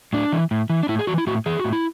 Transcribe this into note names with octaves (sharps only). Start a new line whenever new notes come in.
A2 D4
E3
A2
E3
D4
A2 E4
G#4
E3 F#4
E4
A2 F#4
E3 G#4
A2 F#4
E4